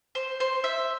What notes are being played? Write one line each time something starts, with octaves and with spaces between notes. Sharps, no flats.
C5
C5
E5